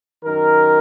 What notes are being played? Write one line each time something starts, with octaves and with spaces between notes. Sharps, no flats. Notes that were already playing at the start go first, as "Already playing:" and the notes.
F#2 D#3 A#4